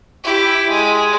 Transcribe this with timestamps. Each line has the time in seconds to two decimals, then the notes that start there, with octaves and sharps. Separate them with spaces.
0.23 E4 G4
0.69 G#3